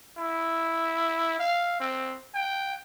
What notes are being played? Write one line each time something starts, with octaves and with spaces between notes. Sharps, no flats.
E4
F5
C4
G5